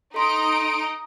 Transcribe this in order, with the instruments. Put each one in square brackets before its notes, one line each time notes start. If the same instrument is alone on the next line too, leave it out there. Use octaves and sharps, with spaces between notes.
[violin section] D#4 D#5 D7 [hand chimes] A4 C6